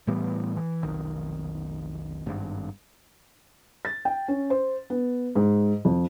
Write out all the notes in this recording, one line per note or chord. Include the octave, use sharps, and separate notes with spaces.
A2 E3 G3 B3
E3
F1 B1 D#3
G#1 G2
A6
G5
C#4
C5
B3
G#2
F2